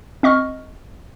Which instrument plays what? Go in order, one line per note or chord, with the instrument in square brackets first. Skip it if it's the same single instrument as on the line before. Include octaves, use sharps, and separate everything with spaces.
[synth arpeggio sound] C4 D#5 C#6 F6